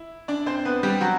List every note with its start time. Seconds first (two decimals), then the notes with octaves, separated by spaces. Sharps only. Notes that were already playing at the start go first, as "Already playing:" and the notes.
Already playing: E4
0.28 D4 D5
0.46 C4 C5
0.65 B3 B4
0.83 G3 G4
1.01 F#3 F#4